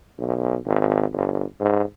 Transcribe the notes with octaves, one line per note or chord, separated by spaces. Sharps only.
B1
G#1
G1
G#2